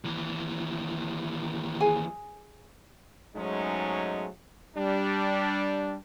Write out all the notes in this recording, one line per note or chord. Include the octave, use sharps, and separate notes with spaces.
D#2 E3
G#4 G#5
G#2 F#3 G#3 A3 C#4 D#4
G3 D4